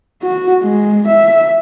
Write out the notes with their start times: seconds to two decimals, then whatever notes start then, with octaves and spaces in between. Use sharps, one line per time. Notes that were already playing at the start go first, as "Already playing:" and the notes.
0.23 F#4
0.63 G#3
1.07 E5